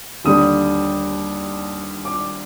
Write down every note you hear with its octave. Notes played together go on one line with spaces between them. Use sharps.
D#2 D3 G3 D4 D#6
D6